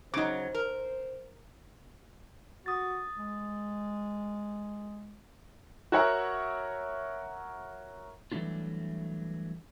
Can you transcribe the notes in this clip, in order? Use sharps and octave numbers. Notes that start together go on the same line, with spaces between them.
C#3 F#3 D#4 C5 D6
A#4
F#4 D#6 A6
G#3
F#4 A#4 C#5 E5 F#5
E3 F#3 G3 A3 D4 F4